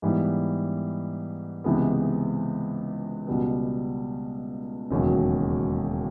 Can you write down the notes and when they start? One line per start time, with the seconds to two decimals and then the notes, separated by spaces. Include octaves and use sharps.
0.02 G#2 E3 G3 B3
1.64 C#2 C3 E3 G#3 B3
3.27 C#2 B2 G3 B3
4.91 E1 D#2 C#3 F#3